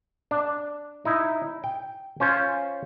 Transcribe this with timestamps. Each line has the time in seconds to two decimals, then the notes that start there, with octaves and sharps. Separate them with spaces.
0.31 D4
1.05 D#4 E4
1.64 G5
2.20 C#4 F4 C5